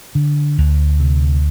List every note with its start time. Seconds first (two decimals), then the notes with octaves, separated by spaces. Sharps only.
0.15 D3
0.58 D2
1.00 C3